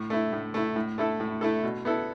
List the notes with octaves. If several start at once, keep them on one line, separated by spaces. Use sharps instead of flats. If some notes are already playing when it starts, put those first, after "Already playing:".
Already playing: A2
A3 E4
A2
A3 E4
A2
A3 E4 A4
A2
A3 E4 A4
B2
B3 E4 A4